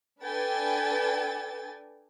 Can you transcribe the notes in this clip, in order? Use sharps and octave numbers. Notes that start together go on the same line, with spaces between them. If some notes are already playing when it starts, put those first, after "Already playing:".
D4 A4 B4 G5 G#5 A6